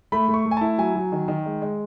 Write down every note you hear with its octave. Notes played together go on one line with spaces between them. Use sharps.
A3 B5
A3
C#6
A3
G#5
E4 A5
F#3 G#5
F#3
D#3
D#3
G#3
G#3